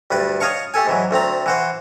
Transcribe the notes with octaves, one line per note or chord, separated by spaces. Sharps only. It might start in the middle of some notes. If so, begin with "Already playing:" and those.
D2 G2 B4 D5
C#5 D#5 F5 A5 C#6
A3 G4 A4 G#5
G#2 E3 F#3
D2 A3 C4 A#5
E3 F#4 C5